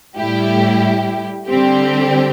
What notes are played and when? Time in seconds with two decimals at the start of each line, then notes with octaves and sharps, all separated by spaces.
0.17 A2 G3 E4 G4
1.48 D3 G3 C4 G4